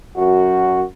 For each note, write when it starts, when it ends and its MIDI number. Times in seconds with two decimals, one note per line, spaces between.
0.17 0.82 42
0.17 0.82 66